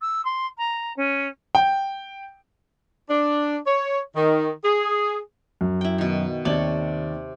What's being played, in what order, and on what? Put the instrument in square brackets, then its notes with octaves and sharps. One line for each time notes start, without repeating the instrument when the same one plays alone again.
[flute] E6
C6
A#5
C#4
[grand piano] G5
[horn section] D4
C#5
D#3
G#4
[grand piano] F#2
[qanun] E4 G5
B2 D#3
[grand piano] D#2 D5 F#7 [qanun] C3 C#5 A5